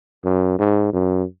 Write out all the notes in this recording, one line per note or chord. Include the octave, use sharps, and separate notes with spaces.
F#2
G#2
F#2